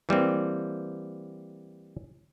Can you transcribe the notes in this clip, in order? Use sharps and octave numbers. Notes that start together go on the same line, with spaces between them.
E3 G3 A#3 C4